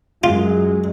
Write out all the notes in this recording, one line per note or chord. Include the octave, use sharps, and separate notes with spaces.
F#2 F#3 G#3 F4